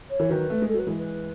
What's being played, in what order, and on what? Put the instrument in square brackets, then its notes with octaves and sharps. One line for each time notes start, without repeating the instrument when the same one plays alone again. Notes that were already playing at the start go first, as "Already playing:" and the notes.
[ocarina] C#5
[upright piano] E3
[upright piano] D#3 F#3 [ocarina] B4
[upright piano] A3
G#3
[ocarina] A4
[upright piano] F#3 [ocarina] B4
[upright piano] E3 G#3
[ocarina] B4